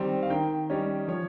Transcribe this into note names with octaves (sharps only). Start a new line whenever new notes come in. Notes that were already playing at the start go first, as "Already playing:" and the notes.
Already playing: D#3 G3 C4
F5
D#3 G5
G3 C#4 D#5
F3 C#5